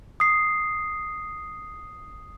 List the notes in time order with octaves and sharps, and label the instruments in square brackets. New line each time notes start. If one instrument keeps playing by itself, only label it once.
[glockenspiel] D#6 C7